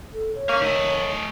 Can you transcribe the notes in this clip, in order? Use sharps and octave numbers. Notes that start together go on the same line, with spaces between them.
A4
C#5
A#3 C#4
D#3 A3 D#5